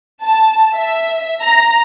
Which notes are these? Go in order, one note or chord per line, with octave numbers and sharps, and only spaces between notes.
A5
E5
A#5